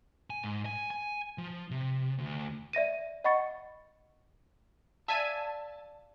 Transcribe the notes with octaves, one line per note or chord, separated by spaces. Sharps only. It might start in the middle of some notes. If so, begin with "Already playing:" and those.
G#5
G#2
G#5
G#5
F3
C3
D2
D5 E5 A#6 D#7
D#5 F#5 B5 C#6 A6 C#7
D5 E5 F5 G#5 A5 D#7